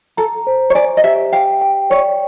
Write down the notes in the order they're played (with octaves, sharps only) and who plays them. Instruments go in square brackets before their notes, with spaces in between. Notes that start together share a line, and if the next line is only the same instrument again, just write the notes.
[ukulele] A4 [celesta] A#5
[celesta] C5
[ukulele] C#5
[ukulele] D5 [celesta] G#5
[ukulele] D#5
[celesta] G4 [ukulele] E5
[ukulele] F5 [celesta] G5
[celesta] G5
[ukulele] C#5 [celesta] D5